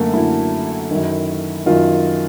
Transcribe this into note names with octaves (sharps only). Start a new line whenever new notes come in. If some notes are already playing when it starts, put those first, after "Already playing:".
Already playing: F#2 D3 A3 A#3
F#2 D3 E4
F#2 D#3
F#2 D#3 F4